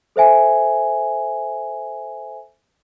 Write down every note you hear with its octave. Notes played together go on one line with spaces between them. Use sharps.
A4 C5 E5 G#5